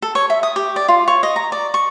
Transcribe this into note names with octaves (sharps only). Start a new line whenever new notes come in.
A4
C#5
E5
D#6
G4
D5
F4
C#5
D#5
A#5
D5
C#6